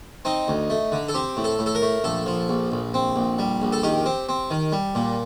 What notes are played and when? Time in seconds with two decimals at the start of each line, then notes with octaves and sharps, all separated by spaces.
0.25 C4 D#4
0.48 D2
0.70 A3
0.92 D3
1.08 A4
1.14 C4 G4
1.37 A2
1.44 A4
1.59 A2
1.66 A4
1.75 A#4
1.82 A3
2.04 A#1 A4
2.26 F3
2.49 A#1
2.72 A#1
2.94 C4
3.16 A#1
3.39 G3
3.62 A#1
3.72 A4
3.83 D#3 G4
4.06 C4
4.29 C4
4.51 D#3
4.72 G3
4.95 A#2